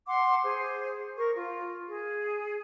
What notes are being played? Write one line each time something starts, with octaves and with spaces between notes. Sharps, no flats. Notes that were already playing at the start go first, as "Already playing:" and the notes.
F#5 C6 D6
G#4 C5
A#4 C#6
F4
G#4